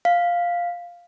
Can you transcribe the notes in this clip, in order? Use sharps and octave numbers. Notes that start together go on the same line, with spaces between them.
F5